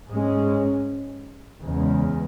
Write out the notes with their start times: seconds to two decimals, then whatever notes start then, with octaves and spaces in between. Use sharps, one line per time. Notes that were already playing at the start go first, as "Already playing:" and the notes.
0.10 G#2 G#3 C#4
1.62 E2 C#3 G#3